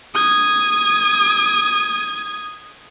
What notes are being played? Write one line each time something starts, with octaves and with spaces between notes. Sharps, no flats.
D#6 G#6